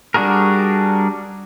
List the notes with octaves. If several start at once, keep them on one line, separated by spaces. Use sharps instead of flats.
G3 D4 F#4 G#4 A#4